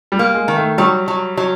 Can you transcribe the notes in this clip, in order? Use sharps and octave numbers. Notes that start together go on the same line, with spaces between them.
G3
A#3
G#3
D#3
A3
F#3 G3
F#3
F#3